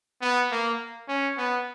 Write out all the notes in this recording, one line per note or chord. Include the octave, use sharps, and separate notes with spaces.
B3
A#3
C#4
B3